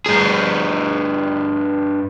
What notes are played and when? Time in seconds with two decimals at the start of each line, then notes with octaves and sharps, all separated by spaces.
0.06 G2 G#4